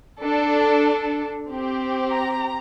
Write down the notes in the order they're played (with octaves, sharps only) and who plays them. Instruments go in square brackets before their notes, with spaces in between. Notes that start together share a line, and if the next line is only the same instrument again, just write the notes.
[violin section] D4 A4
C4 G4
A#5